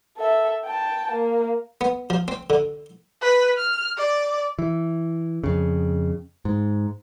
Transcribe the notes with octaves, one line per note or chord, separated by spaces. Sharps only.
A4 E5
G5 A5
A#3
B3
F3
C4
D3
B4
F6
D5
E3
F2 C#3
G#2